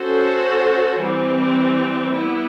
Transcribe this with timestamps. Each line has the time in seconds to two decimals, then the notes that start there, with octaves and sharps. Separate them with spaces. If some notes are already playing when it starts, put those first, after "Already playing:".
Already playing: C#4 F#4 A4 C5
1.02 E3 G3 C4
2.16 G3 B3 E4